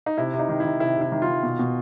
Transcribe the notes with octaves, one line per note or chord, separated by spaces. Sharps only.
D#4
C3 E4
C3
D#4
D#3
D#3 E4
C3 E4
C3 E4
D#3
F4
D#3
B2
B2